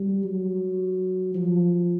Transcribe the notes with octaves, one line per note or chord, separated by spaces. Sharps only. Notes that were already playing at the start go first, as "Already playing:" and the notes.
Already playing: G3
F#3
F3